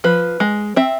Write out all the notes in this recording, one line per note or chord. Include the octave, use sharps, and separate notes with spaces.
F3 B4
G#3
C4 E5